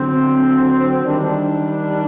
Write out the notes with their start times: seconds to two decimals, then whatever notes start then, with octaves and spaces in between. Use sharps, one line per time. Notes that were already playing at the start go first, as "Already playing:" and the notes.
Already playing: D3 F#3 C4
1.04 D#3 G3 D4